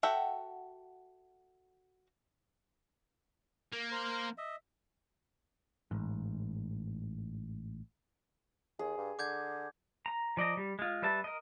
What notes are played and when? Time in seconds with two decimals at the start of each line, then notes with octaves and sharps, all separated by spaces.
0.03 F#4 A4 E5 F#5 G5
3.73 A#3
3.92 A#4 C5
4.38 D#5 E5
5.91 A1 G#2
8.79 D#2 G#4
8.97 G2
9.19 D3 D6 G6 G#6
10.06 A#5
10.37 F3 D5 D#5 A#5
10.57 G3
10.79 G#3 F4
11.02 G3 B4 E5 A5
11.24 A#4 D#5